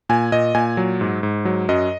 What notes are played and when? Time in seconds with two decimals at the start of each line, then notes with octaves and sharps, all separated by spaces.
0.09 A#2 G#5
0.32 A#2 D#5
0.55 A#2 G#5
0.77 F#3
1.01 G#2
1.23 G#2
1.45 F#3
1.69 F#2 D#5